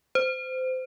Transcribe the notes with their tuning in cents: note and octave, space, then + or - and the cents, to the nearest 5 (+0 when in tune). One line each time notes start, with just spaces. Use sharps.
C5 -25